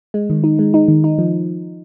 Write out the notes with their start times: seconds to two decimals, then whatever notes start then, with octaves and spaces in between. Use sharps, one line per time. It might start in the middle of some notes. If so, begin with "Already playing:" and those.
0.14 G#3
0.30 D#3
0.44 D#4
0.59 G#3
0.74 D#4
0.88 D#3
1.04 D#4
1.18 F3